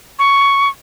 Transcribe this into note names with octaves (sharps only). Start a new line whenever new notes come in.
C#6